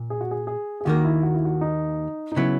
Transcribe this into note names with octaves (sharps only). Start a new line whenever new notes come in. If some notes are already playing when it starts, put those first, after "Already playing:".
Already playing: A#2
G#4
F#4
G#4
G#4
G#4
D#2 D#3 A#3 F#4
E4
F#4
E4
F#4
D#4
D#4
C#3 F#3 B3 E4